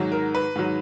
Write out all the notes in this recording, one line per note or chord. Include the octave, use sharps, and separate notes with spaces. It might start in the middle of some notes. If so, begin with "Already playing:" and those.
Already playing: G#2 D#3 F#3
A#4
B4
G#2 D#3 F#3